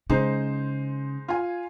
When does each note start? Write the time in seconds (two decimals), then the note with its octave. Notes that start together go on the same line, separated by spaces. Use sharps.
0.10 C#3 G#3 D#4 C5
1.28 F4 G#5